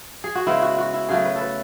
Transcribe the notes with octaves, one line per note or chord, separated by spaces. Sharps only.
G#4
F#4
C#3 G#3 B3 E4
F#4
F#4
E4
C#3 F#3 A3 G#4
B4
A4
B4